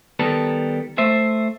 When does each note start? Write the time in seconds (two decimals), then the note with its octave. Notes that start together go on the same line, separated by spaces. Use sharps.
0.19 D#3 G3 B3 A4 A#4
0.98 A3 C5 E5